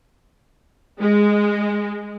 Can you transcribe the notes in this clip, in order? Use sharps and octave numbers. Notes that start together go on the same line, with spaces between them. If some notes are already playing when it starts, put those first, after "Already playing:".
G#3